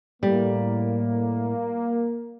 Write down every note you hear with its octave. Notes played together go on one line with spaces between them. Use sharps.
A2 G3 A#3